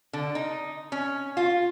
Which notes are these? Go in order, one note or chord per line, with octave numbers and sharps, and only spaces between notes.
D3
D#4
C#4
F4